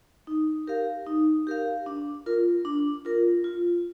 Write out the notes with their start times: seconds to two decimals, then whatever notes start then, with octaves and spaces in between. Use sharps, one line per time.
0.27 D#4
0.67 G4 A#4 F5
1.07 D#4
1.47 G4 A#4 F5
1.86 D4
2.26 F4 A#4
2.65 D4
3.05 F4 A#4
3.44 F4